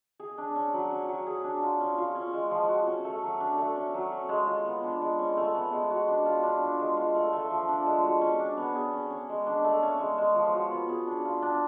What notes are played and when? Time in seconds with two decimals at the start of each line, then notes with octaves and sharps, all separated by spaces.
0.20 G#4
0.38 D4
0.55 C#4
0.74 F#3
0.91 C#4
1.09 F#3
1.27 G#4
1.44 D4
1.63 F4
1.81 C#4
1.98 F4
2.15 C#4
2.33 G#3
2.51 F3
2.69 F#4
2.87 C#4
3.04 A3
3.23 F#3
3.40 D4
3.58 A3
3.76 C#4
3.94 F#3
4.12 C#4
4.29 G#3
4.47 F4
4.65 B3
4.84 D4
5.01 G#3
5.19 C#4
5.37 A3
5.54 B3
5.72 G#3
5.91 F#4
6.08 D4
6.26 F4
6.43 D4
6.61 D4
6.79 G#3
6.97 F4
7.15 A3
7.33 A3
7.50 F3
7.68 D4
7.86 G#3
8.04 F#4
8.21 C#4
8.40 D4
8.57 B3
8.75 G#4
8.93 C#4
9.10 C#4
9.29 G#3
9.47 D4
9.64 A3
9.83 C#4
10.00 G#3
10.18 G#3
10.36 F3
10.53 F#4
10.71 B3
10.89 G#4
11.07 D4
11.25 F4
11.42 D4